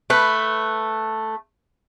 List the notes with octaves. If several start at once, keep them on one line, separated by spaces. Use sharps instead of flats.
A3 B4